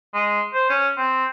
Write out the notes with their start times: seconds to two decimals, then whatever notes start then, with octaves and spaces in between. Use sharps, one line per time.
0.14 G#3
0.54 C5
0.70 C#4
0.97 C4